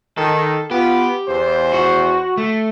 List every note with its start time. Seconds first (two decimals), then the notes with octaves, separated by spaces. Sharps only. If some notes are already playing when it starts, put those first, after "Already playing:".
0.18 D#3 A4
0.71 B3 F4 G4
1.29 E2 C5
1.73 F#4
2.37 A3